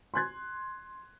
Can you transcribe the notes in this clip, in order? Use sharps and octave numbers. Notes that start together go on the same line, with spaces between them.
C6 F#6 G#6